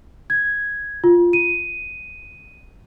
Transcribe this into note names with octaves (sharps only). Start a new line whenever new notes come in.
G#6
F4
D#7